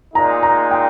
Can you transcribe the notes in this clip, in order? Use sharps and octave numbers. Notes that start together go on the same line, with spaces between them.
A#2 G#3 D#4 A#5
A#5
G5